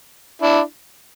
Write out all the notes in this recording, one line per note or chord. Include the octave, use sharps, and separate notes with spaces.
D4 E4